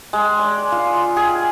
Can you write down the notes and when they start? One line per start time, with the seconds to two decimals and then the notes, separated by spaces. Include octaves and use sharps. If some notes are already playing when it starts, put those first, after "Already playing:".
0.13 G#3
0.39 D5
0.72 F4
1.17 G#4